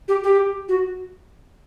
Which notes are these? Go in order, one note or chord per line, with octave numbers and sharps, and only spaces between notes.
G4
G4
F#4